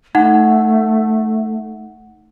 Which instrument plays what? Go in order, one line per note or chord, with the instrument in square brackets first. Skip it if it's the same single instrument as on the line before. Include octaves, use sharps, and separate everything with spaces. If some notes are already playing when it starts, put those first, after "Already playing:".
[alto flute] A3 [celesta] D#4 F#5